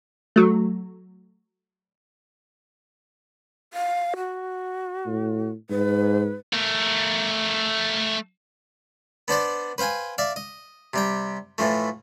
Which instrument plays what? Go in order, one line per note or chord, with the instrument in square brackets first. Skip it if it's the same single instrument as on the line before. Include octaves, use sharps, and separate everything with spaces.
[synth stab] F#3 A3
[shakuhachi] F5
F#4
[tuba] A2
[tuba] G#2 [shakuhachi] B4
[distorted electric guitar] A3 A#4
[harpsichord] B3 D4 C5 D5
B4 C5 F5 G5 G#5
D5 E5 F5
D#5
C3 G3 G5
A2 E3 F3 A3